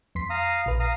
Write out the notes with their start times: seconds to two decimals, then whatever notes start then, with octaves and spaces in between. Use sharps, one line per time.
0.15 F2 C6 B6
0.30 F5 A#5 D#6
0.66 A#1 B4
0.80 F5 A#5 D#6